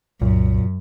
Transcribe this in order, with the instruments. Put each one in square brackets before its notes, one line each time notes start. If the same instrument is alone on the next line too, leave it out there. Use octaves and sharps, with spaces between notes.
[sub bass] C2 [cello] F#2 [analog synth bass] A#2